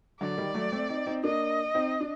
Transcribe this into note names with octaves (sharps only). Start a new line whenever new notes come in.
D3 F#3 D5
D#3 G3
F#3 A3
A3 C4
C4 D#4
C4 D#4
A#3 D4 D#5
C4 D#4
D4